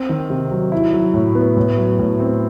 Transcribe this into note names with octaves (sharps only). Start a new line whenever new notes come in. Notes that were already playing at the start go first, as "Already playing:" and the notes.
Already playing: C4
D#3
C3
F#3
E4
F#3
A2
B3
A2
F#3
A2
C4